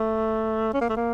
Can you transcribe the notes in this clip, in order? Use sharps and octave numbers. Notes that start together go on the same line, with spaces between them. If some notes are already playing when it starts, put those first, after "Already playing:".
Already playing: A3
C#4
A#3
A3
A#3